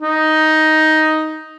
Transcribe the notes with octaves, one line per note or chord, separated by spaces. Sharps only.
D#4